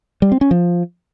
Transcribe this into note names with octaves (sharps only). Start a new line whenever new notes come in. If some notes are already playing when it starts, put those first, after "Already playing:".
G3
C4
C#4
F3